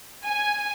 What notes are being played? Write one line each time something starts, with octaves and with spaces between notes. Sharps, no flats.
G#5